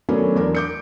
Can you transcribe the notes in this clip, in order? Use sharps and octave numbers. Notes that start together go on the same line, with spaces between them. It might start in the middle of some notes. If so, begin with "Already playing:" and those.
D#3 F#3 A3 B3 C#4 D4
E2 D4 A#4
D6 G6 C#7